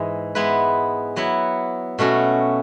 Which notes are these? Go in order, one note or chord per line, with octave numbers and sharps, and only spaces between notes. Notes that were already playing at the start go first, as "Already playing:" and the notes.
Already playing: G#2 E3 G#3
G#3 B3 E4 B4
F#3 B3 E4
B2 A3 C#4 F#4